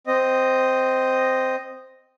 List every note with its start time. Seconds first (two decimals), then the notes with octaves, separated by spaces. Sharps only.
0.07 C4 D#5